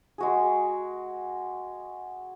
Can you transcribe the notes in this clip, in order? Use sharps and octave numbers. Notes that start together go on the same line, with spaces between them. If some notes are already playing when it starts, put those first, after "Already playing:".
G#3 F#4 G#4